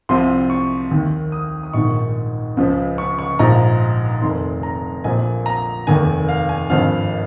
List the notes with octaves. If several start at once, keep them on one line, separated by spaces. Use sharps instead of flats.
C2 C3 F3 C6
C#6
D#2 D#3
D#6
D#6
A#1 G#2 D#3 C#6
C#2 C#3 F3
C#6
C#6
A#1 G#2 F3 A#5
F1 F2 D#3 C6
A#5
A#1 A#2 F3 G#5
A#5
F1 D#2 D#3 G#5
F5
G#5
G#1 G2 F3 F5